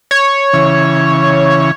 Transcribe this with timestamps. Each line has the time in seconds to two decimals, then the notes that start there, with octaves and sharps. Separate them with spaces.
0.11 C#5
0.53 C#3 E3